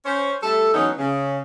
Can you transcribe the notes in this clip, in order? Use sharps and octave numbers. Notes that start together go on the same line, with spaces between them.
C#4 C5 C#5
G3 A3 E4 A4
E3 F#3 G#3 B3 C#4 D#4
C#3